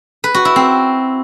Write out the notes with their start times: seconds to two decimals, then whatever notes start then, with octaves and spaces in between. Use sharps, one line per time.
0.24 B4
0.34 F#4
0.45 E4
0.56 C4